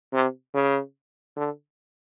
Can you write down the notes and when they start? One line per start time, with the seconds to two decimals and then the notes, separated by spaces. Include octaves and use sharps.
0.13 C3
0.54 C#3
1.37 D3